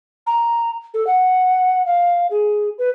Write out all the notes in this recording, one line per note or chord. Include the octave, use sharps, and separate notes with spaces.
A#5
A4
F#5
F5
G#4
B4